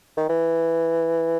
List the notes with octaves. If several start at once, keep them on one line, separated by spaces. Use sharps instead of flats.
D#3
E3